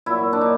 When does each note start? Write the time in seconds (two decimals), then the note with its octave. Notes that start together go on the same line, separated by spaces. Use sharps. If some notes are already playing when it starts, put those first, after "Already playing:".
0.06 A#2 F#3 E4
0.33 D4
0.41 D#4